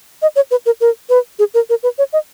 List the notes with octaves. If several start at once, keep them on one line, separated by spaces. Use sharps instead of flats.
D#5
C#5
B4
A#4
A#4
B4
G#4
A#4
A#4
B4
C#5
D#5